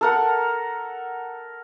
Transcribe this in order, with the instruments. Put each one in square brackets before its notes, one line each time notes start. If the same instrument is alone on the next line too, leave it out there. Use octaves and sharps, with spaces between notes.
[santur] A4 A#4 F#5